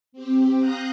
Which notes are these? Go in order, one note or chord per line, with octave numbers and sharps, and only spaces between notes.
C4 G4
F5 A#5 D#6 F#6 G6 A#6